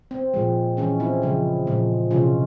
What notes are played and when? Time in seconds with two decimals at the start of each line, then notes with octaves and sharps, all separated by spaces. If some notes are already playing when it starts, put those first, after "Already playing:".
0.11 C4
0.34 A#2 F3 G#3
0.77 E3 G#3 C#4
1.00 C4 E4
1.22 C#3 F3 G#3
1.67 A#2 F3 G#3
2.11 C3 E3 G#3 C#4 F4